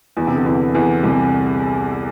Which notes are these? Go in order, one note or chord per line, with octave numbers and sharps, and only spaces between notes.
E2 E3
C3
D3
E2 E3
E2 E3
C2 C3